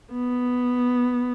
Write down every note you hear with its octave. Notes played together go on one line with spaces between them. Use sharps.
B3